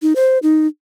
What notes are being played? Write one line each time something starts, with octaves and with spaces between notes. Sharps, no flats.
D#4
C5
D#4